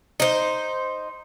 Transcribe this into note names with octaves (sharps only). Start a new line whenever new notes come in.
D#4 C5